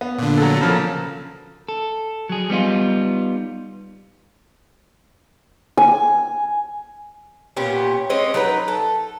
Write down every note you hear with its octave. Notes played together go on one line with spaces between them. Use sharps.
B3
A#2 D3
F#3 A4
C#3 F3 A#3
A4
F#3 G#4
G3 B3 D#4 F4
G#5
A#2 B3 C#4 G4
G#3 C4 C#4 D#5
F#3 D#4 A#4 B4
A4